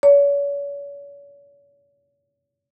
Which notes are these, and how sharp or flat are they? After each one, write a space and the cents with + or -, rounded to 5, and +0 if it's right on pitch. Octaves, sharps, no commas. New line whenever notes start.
C#5 +40